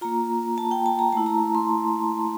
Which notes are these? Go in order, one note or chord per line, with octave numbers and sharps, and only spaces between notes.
A#3 F4 A#5
A5
G5
A5
A#5
A3 E4 A5
A#5
C6